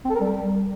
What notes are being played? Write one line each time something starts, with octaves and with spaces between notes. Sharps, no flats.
C4
A4
A#4
G3